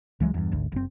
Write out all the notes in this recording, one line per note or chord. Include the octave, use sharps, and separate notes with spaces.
C#2 E3 F#3 G#3
E2 G2
G#1 D2
F#1 C4